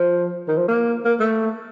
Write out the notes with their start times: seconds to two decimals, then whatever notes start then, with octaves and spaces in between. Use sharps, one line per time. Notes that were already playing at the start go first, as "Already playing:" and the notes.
Already playing: F3
0.48 D#3
0.58 F3
0.68 A#3
1.05 A#3
1.20 A3